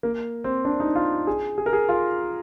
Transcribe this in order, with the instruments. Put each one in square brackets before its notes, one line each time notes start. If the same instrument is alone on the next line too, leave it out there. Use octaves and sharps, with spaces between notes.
[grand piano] A#3
C4
D4
D#4
F4
G#4
G#4
A#4
G#4
F4